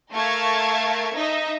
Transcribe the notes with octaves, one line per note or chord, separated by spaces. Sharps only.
A3 A#4 F5 A5 C#6 G#6
D#4 D#5 E5